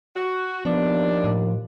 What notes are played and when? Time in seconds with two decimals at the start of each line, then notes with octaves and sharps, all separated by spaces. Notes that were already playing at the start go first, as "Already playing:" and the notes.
0.15 F#4
0.65 D#2 F3 B3 D4
1.24 A2